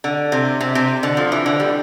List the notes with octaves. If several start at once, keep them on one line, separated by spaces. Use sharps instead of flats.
D3
C3
C3
C3
D3
F3
E3
D3
G3